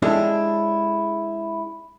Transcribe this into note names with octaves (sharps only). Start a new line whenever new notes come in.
G#3 C#4 D4 E4 G4 A4